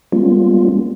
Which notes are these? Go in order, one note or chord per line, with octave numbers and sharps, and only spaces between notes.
G3 G#3 A#3 B3 C#4 F4